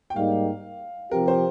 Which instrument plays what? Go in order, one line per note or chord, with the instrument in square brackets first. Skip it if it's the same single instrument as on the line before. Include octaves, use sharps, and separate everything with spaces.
[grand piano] G5
[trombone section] G#2 G3 A#3 D#4 G4 [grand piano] F5
[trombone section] C3 F3 C4 G4 [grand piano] A#4
[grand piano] C5